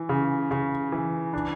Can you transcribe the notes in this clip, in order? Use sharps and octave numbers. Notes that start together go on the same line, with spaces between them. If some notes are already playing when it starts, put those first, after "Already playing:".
Already playing: E3
C#3
C#3
E3
D4